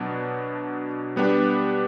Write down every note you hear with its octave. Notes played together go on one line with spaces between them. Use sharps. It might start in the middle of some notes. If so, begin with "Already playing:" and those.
Already playing: B2 F#3 B3 D4
G3 B3 D4 G4